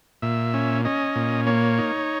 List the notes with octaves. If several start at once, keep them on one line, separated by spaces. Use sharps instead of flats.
A#2 E5
C#4
C#4 D#5
A#2
A#3 C#5
D#4